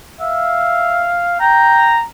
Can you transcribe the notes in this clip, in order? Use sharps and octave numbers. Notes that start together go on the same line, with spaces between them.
E5 F5
G5 A#5